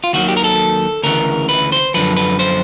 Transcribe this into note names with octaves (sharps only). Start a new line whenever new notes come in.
F4
D#2 D#3 F#3 F#4
G4
A#4
A4
D2 C#3 E3 A#4
B4
C5
F#2 D3 F3 B4
B4
C5